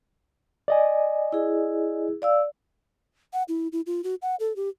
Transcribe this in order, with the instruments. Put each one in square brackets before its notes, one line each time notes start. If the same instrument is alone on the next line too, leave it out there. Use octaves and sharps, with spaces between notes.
[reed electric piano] D5 D#5 G#5
[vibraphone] E4 G#4
D5 F5 E6
[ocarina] F#5
E4
E4
F4
F#4
F#5
A4
G4